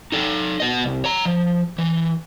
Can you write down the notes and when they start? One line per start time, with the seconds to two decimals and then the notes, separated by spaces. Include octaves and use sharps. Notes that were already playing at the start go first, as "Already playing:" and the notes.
0.12 D#4 A4
0.60 B3 D#5
0.84 C2
1.04 C#5 A#5
1.25 F3
1.78 E3